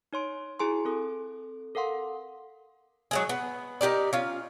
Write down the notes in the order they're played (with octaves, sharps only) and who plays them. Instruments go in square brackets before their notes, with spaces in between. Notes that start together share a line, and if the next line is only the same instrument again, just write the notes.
[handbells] D#4 C#5 C6 D7
E4 F#4 G#4 G#5 A#5 C6
C4 A4 D#6
A4 A#4 F5 F#5 C6
[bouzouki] F#3 G#3 G#4
B3
D#4 G4 A#4 D5
C#4 F4